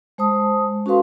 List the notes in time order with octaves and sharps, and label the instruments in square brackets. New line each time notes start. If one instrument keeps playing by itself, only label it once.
[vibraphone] G#3 C5 A5 D#6
C#4 F#4 A4 B4 F5 C6